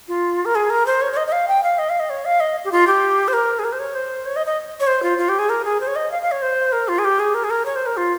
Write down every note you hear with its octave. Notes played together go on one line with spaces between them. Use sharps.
F4
A#4
G#4
A#4
C5
C#5
C#5
D#5
D#5
F5
G5
F5
D#5
F5
D#5
C#5
F5
D#5
G4
F4
G4
C5
A#4
G#4
A#4
C5
C#5
C5
C#5
D#5
D#5
C#5
C5
F4
F4
G4
G#4
A#4
G#4
C5
C#5
D#5
F5
F5
C#5
C5
A#4
F4
G#4
G4
G#4
A#4
G#4
A#4
C#5
C5
A#4
F4